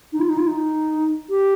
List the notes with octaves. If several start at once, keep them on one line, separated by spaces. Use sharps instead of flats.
D#4
F4
D#4
F4
D#4
G4